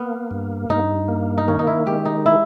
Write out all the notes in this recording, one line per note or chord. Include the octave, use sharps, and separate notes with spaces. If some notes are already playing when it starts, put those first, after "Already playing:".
Already playing: A#3 B3
G2
G2 D#4
A#3
D#4
D#3 C#4
D#4
E4
G#3 G4
D#4
E4